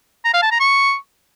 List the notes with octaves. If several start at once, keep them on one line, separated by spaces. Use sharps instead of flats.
A#5
F5
A5
A#5
C#6